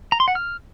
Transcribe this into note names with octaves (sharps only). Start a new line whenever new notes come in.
A#5
C6
F#5
F6